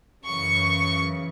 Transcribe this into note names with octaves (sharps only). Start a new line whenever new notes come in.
F#2 C#3 E3 C#6